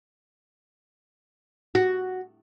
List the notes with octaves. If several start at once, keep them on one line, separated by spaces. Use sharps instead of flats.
F#4